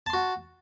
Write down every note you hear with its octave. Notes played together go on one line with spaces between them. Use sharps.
F#4 A5 C6